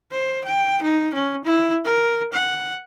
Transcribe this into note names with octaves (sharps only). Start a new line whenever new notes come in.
C5
G5
D#4
C#4
E4
A#4
F#5